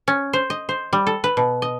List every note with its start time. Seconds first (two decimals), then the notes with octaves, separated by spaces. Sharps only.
0.08 C#4
0.33 C5
0.50 D#5
0.69 C5
0.93 G3
1.07 A4
1.24 B4
1.37 B2
1.62 D#5